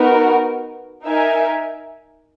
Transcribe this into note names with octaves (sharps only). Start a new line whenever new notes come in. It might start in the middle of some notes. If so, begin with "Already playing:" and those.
Already playing: B3 D#4 F#4 A#4
D#4 A#4 E5 G#5